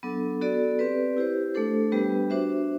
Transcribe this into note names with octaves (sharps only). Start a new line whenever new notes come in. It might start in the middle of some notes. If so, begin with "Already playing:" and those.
F#3 B3 D4 A4
B3 F#4 A4 D5
C4 G4 B4 D5
E4 G4 C5
A3 D4 A4 C5
G3 B3 D4 G4 B4
D4 F#4 C5 E5